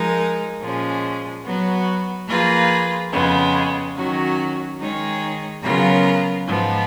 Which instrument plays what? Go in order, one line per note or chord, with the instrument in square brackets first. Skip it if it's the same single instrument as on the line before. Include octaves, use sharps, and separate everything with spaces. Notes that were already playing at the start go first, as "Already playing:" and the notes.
Already playing: [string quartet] F3 G#3 D#4 A#4
A#2 F3 G#3 C#4
F#3 B3 F#4 B4
F3 A#3 F4 G#4 B4
F2 C#3 G#3 B3
D#3 F#3 C#4 F#4
D#3 G#3 D#4 G#4 C#5
C#3 F#3 B3 F4 A#4
G#2 F3 B3